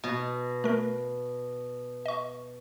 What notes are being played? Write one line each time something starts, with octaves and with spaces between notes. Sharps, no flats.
B2
A3 A#4
D#5 C#6